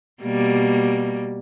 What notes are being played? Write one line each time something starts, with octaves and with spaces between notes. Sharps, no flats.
B2 G3 A#3